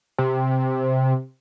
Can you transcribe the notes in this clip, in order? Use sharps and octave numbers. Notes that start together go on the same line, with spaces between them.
C3